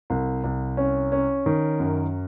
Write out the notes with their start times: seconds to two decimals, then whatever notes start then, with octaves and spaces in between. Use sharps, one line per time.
0.10 C2
0.44 C2
0.77 C#4
1.12 C#4
1.46 D#3
1.80 F#2